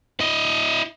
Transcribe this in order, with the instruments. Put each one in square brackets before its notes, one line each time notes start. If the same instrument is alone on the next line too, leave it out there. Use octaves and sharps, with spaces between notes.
[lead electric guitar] E4 D#5